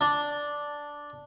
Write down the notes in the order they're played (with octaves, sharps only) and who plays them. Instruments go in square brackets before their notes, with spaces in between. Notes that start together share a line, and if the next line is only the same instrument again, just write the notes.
[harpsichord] D4